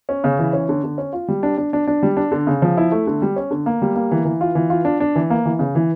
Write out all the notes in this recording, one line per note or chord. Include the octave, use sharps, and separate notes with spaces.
C#4
C#3
E3
C#4
D3
D3
C#4
F4
G3
D4
D4
D4
D4
G3
D4
D3
C#3
F3
E4
A3
D3
G3
C#4
D3
A#3
G3
A#3
E3
E3
F4
E3
F4
D4
D4
E3
A#3
E3
C#3
E3